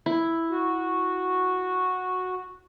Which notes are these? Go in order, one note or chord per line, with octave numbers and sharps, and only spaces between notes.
E4
F#4